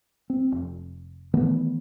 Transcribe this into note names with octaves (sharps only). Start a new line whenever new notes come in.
C4
F1
D#3 E3 A3 B3